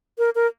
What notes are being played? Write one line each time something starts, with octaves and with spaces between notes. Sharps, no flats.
A#4
A#4